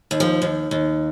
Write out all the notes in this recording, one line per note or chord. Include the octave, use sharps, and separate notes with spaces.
D#2
F3
D#2
D#2